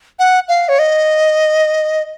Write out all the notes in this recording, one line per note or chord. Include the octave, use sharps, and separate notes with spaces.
F#5
F5
C#5
D#5